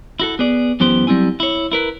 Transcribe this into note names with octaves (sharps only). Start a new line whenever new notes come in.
E4 F#4 A4
B3 G#4 D5
F#2 E3 B3 G4 C5
F#3 G3 C4 E4 G#5
E4 C#5
E4 A#4 B4